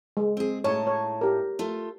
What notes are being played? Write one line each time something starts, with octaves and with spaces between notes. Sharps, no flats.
G#3
C4 G#4
A2 D#4 C#5 A5
C#5
G4 A#4
A3 F4